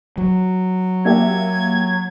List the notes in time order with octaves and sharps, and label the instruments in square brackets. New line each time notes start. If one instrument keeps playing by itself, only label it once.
[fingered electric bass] F#3
[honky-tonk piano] A#3 G4 E5 [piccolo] G#6